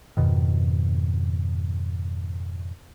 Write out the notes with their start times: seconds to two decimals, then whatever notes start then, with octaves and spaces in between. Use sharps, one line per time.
0.17 F2 G#2 B2 D#3